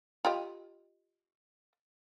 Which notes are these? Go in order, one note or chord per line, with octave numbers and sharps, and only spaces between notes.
F4 G4 D#5